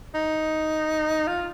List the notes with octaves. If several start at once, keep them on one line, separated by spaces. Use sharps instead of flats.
D#4
F4